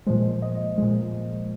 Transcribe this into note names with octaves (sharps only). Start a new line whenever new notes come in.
A#2 F3 G#3 C5
D#5
A#2 F3 G#3